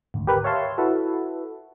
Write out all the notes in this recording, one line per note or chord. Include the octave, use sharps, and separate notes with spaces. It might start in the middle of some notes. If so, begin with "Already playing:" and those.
G#1 D2
G4 A#4 B4
C#5 E5 F5 A5 C6
E4 F#4 A4 B4